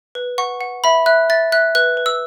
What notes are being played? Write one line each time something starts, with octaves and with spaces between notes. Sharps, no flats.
B4
F#5 C#6
F#5
E5 B5
E5 F#6
E5 A6
E5 F#6
B4 F#6
B4
E6